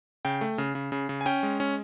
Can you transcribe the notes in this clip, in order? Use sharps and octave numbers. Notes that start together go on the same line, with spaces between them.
C#3 G5
A3
C#3
C#3
C#3
C#3
G#5
C#4 G5
G#3
C#4